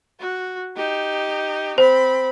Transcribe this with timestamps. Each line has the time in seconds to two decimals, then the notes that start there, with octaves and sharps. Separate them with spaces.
0.19 F#4
0.76 D#4 G4
1.78 C4 C5 B5